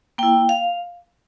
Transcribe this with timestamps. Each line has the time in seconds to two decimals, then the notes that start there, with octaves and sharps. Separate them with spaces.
0.18 A#3 E4 G5
0.49 F5